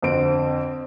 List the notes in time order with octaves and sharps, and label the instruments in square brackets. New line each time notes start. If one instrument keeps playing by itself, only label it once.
[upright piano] F2 D3 C4 D7